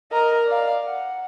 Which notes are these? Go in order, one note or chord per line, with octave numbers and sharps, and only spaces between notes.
A#4 D#5
D5 F5
F#5